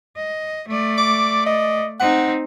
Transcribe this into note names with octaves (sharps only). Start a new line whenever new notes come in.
D#5
A3 D5
D6
D#5
C4 D#4 F#5